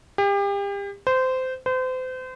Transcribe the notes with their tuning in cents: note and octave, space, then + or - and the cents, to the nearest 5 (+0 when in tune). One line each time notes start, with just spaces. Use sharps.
G4 +35
C5 -20
C5 -35